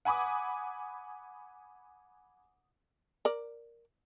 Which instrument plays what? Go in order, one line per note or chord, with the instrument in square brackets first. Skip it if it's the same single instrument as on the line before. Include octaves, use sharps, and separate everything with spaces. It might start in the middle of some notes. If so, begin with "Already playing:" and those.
[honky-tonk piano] F#5 G#5 B5 D6 D#6
[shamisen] A#4 D5